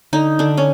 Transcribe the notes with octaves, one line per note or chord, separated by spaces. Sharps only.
D3 D#4
D3 D4
C#4